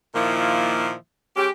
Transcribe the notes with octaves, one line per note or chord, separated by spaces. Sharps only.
A#2 D#3 F3 A#3 E4
G#3 C#4 G4